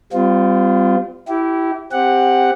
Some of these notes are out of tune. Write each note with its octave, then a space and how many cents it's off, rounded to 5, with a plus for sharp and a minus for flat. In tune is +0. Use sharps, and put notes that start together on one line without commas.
G3 +0 C4 -40 F4 +0
E4 +0 G4 -25
C4 +0 G4 +15 F#5 +0